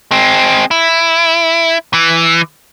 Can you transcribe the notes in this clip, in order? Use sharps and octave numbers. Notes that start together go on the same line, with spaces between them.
G#3 C4
E4
E3